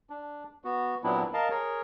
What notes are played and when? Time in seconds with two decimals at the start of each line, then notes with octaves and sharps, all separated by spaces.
0.10 D4
0.64 B3 F#4
1.04 A#2 F#3 B3 C4 D4 E4
1.34 A#4 D#5 F5 A5
1.50 G#4 A#4 C#5